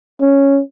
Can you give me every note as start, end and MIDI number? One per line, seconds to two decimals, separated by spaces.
0.20 0.60 61